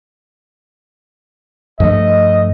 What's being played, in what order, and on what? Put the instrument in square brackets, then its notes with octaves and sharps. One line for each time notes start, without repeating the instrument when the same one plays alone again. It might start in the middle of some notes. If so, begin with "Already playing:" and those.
[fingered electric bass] G2 F3 A3 [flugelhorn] D#5